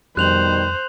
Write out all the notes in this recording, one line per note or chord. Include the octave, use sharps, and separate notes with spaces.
F2 B2 D#3 G3 C5 F#6 F7 F#7